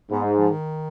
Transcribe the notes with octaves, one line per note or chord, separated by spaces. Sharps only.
G#2 B3
G#3
F3
D#3